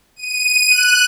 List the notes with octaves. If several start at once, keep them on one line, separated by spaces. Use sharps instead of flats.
D#7
F#6